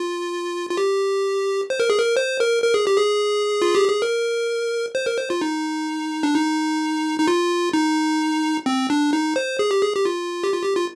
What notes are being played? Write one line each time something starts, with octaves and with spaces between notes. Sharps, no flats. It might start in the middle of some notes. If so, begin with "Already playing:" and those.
Already playing: F4
F4
G4
C5
A#4
G#4
A#4
C5
A#4
A#4
G#4
G4
G#4
F4
G4
G#4
A#4
C5
A#4
C5
F4
D#4
D4
D#4
D#4
F4
D#4
C4
D4
D#4
C5
G#4
G4
G#4
G4
F4
G4
F4
G4
F4